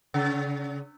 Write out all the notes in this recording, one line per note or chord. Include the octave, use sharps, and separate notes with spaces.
C#3